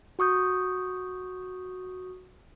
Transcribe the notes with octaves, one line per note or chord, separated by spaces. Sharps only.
F#4 C#6 D#6 G6